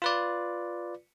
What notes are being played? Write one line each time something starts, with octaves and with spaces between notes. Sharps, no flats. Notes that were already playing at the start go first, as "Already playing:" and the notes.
F4 B4 D5